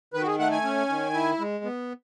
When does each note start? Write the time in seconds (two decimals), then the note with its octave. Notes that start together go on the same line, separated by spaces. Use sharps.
0.14 D#3 B4
0.22 F#4
0.27 G#4
0.39 A3 F#5
0.52 G#5
0.64 C#4
0.89 D#3
1.14 E4
1.39 G#3
1.64 B3